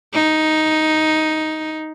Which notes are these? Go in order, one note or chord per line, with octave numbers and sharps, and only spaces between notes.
D#4